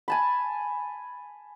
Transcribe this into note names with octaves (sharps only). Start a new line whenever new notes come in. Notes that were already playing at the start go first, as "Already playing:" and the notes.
G#5 A5 B5